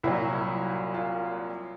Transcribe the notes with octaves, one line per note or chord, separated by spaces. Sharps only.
C2 A#2 F#3 E4
F4